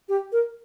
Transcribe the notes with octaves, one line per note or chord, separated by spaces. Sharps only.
G4
A#4